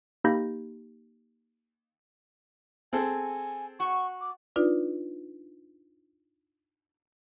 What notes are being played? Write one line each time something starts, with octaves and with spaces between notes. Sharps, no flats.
A#3 D#4 G4 B5 G6 A#6
C4 G#4 A4 G#5
F#4 C#6
D6
D4 D#4 F4 B4 D5